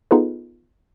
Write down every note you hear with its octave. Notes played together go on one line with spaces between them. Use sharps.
B3 D#4 F4 G#4 A4 B4